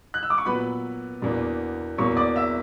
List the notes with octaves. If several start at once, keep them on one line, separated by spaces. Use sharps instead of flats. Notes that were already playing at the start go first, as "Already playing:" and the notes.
F#6
E6
D6
C#6
A#2 F#3 B3 B4 B5
E2 B2 A#3 D4
E2 B2 A#3 C#5 C#6
D5 D6
E5 E6